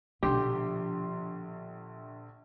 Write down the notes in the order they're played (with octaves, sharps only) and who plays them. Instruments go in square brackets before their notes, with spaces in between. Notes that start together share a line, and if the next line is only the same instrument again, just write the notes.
[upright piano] A#1 D3 C6 [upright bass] B2 F3 [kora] G4